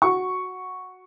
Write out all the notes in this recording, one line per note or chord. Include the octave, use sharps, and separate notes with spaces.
F#4 C#6